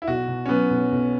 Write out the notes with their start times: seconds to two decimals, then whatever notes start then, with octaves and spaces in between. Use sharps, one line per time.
0.02 E4
0.07 B1 F#4
0.28 B2
0.46 C#4
0.49 F#3 B3
0.70 B1
0.92 B1